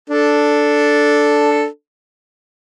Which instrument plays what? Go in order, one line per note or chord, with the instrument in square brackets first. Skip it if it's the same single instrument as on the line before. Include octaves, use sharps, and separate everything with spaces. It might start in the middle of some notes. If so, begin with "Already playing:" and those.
[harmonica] D4 A4